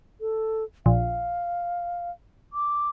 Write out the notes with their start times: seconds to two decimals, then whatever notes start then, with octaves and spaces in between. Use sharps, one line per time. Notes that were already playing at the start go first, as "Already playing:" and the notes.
0.21 A4
0.86 A#1 F5
2.53 D6